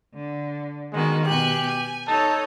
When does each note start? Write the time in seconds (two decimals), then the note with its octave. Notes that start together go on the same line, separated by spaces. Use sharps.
0.14 D3
0.92 D#3 G#3 B3 F#4
1.26 B2 G4 G#5 F#6
1.66 G#5
2.07 D#4 A4 C#5 A5